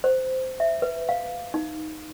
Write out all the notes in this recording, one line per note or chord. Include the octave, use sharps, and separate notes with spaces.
C5
E5
B4
F5
D#4